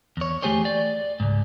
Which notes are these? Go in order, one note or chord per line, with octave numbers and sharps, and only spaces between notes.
E2 C#5
E3 A3 G4 G#4 C5 C#5
D5
C#2 G#2